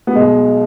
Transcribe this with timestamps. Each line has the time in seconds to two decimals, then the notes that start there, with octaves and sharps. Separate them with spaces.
0.07 B3
0.15 B1 B2 G#3